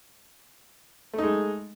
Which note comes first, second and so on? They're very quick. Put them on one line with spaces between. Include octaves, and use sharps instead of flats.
A3 D#4 G#3